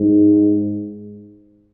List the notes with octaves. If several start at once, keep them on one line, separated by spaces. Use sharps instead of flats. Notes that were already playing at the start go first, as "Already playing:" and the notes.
Already playing: G#2